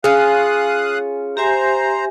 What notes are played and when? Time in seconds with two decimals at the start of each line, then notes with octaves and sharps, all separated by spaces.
0.04 C#4 F4 G#4 F5 D#6 F#6
1.37 G4 C5 E5 G#5 A#5